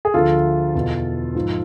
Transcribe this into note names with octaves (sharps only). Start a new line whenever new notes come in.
G#4
D2 D3 F3 F4 A4
E2 B2
G#2 F3